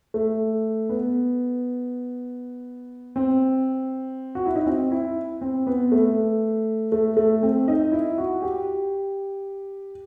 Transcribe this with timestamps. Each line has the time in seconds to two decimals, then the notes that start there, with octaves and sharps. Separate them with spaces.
0.14 A3
0.89 B3
3.16 C4
4.35 F#4
4.46 E4
4.56 D#4
4.66 C4
4.91 E4
5.41 C4
5.67 B3
5.92 A3
6.92 A3
7.17 A3
7.43 C4
7.68 D#4
7.92 E4
8.18 F#4
8.42 G4